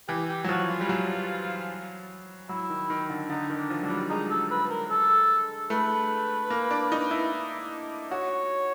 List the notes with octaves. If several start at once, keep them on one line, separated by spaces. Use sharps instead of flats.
E3 G4
G4
F#3
F3 F#4
F4
G3
F#3
F#3 E4
D#3
D#3
D3
D3 D#4
D#3
D4
F3
F#3 D4
G3
G#3 D#4
A4
B4
A#4
A4
A3 B4
A#3
D4
D#4
E4
F#4 C#5